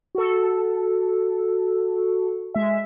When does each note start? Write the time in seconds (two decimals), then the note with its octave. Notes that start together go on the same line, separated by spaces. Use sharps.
0.15 F#4 A4
2.54 G#3 E5